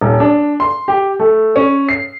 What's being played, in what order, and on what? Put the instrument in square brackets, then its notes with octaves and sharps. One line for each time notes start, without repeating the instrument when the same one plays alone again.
[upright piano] D#1
D4
C6
G4
A3
C#4
C7